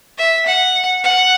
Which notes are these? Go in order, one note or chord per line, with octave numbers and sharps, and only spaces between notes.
E5
F#5
F#5